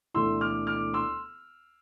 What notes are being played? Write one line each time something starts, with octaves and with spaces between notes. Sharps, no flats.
E1 D2 D3 A3 E4 C6 E6
D6 F6
D6 F6
C6 E6